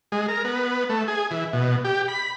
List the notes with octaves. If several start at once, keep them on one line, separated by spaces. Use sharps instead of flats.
G#3
A#4
B3
A3
G#4
E3
B2
G4
B5